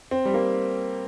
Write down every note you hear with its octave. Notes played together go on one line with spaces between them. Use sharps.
C4
G3
A#3